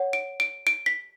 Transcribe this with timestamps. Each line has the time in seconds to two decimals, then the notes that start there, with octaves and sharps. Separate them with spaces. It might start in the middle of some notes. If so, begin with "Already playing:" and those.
Already playing: C#5 F#5
0.13 D7
0.40 D7
0.67 D7
0.86 B6